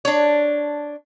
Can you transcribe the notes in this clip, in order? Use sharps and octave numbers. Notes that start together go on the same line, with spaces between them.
D4 C#5